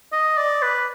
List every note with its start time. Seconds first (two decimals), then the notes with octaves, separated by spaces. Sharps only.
0.13 D#5
0.37 D5
0.62 B4